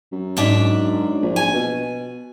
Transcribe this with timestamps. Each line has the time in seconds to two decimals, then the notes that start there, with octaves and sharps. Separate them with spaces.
0.12 F#2
0.37 G#2 D4 E5
1.22 A#1
1.36 G#5
1.54 B2